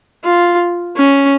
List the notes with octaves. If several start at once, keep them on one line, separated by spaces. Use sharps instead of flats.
F4
C#4